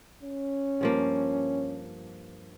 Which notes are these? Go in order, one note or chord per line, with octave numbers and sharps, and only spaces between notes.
C#4
G2 F3 A#3